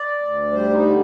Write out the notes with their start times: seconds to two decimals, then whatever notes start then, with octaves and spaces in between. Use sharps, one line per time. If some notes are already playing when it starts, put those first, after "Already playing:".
Already playing: D5
0.22 D2
0.52 G3 C5
0.71 D#4
0.82 D3